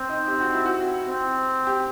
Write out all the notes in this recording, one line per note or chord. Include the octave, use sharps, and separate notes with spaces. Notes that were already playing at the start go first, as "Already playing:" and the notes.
Already playing: C4
D#4
G4
F#4
E4
F#4
C4
G4